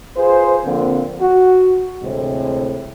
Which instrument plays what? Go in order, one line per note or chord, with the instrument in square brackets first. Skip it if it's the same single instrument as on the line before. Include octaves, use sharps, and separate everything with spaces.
[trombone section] F4 G#4 B4 C5
D3 F3 A#3 C4
F#4
D2 A2 C3 E3 G#3 C4